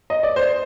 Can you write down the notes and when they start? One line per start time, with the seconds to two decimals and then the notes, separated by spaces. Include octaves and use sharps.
0.10 D#5
0.23 D5
0.36 C5